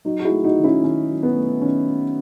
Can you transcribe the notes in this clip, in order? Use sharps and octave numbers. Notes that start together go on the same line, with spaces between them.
F#3 D#4 F#4
F#4
E4 G#4
A3
D#4 F#4
D#3
C#4 E4
D#3 C#4
F#3
B3
A3
D#3 C#4